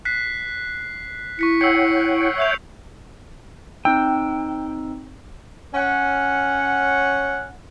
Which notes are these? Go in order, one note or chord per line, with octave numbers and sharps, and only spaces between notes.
F#6 B6 C7
E4 C#6 B6 C#7
C#5 F#5 G5 E6 C7 C#7
E5 E6 G6 F7
C4 D#4 G5 E6
C#4 F#5